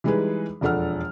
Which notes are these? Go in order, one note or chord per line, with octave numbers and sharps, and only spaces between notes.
E3 G3 G#3 D#4 G#4 B4
E1 F2 D4 A4 F#5 F6